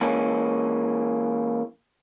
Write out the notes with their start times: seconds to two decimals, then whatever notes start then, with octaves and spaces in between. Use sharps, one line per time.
0.01 E3 G#3 A#3 C#4